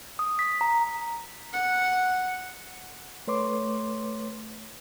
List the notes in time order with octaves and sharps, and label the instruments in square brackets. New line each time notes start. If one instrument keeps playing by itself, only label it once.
[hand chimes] D#6
B6
A#5
[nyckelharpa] F#5
[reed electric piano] A3 B4 C#5 C6 D6